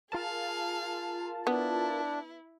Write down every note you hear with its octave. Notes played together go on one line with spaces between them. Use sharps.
F4 G#4 A#4 F5 A5
B3 D4 E4